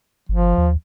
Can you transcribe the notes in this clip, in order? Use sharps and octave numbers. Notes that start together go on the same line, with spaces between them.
G1 F3
D#2